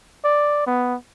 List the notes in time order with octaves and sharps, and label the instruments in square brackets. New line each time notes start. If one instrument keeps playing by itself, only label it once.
[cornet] D5
B3